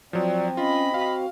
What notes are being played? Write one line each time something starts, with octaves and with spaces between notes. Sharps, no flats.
F3 F#3 C4 D5
C#4 F4 D#5 B5
F#4 F5